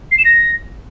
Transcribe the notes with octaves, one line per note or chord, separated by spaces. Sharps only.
C7
E7
A#6